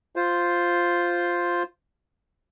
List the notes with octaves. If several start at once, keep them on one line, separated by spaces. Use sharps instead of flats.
F4 C5